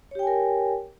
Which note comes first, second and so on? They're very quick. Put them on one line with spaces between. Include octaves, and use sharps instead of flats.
C#5 G4 G5 G#5 A#4